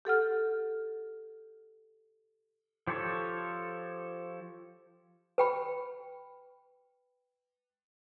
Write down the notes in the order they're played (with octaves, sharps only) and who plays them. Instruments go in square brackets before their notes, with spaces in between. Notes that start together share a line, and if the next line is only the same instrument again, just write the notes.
[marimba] G4 A4 F#5 F6
[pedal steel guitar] F3 G4 A4 C#5
[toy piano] B4 G5 B5